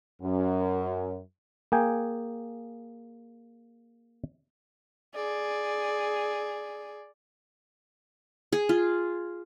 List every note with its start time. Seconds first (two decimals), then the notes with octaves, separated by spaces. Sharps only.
0.22 F#2
1.72 A#3 G#4 G5 G#5
5.15 G#4 D5
8.53 G#4
8.69 F4